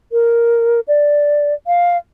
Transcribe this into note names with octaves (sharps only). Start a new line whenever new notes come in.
A#4
D5
F5